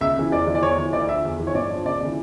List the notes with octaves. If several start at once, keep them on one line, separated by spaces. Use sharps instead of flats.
C#2 E5
C#3 E3
E2 D5
E3
D5
E2 C#5
E3
D2 D5
D3 F3 E5
E2
E3
C#5
G2 D5
D3 F3
C#2 D5
C#3 E3